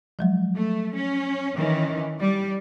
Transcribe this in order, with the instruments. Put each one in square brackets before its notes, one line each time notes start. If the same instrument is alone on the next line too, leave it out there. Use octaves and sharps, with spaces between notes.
[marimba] F3 F#3 G#3
[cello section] A3
C#4
D#3 E3 C#4
G3